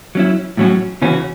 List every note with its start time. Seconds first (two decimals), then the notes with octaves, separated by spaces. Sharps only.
0.15 F#3 C#4 E4
0.57 A2 F#3 C#4 F#4
1.02 C#3 E3 C#4 F#4